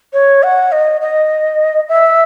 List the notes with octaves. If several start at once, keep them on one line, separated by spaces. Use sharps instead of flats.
C#5
F#5
D#5
D#5
E5